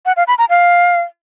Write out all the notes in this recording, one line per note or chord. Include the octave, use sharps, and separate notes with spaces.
F#5
F5
B5
A#5
F5